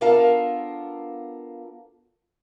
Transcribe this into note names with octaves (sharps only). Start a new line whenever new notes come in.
B3 D4 F4 A4 A#4 F5